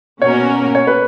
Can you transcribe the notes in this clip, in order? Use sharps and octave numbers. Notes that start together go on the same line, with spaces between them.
B2 A#3 C#4 F#4 A#4 C#5
C#5
B4